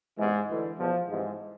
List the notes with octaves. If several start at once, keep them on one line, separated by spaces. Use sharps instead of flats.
E2 G#2 C3 E3 G#3
D2 D3 E3
E2 B2 F3
C2 G#2 C3 E3 G#3